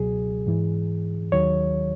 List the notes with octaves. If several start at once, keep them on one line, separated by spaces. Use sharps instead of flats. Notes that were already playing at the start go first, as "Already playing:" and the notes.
Already playing: C#2 B2 F#3 G#4
G#2 E3
D#2 D#3 F#3 C#5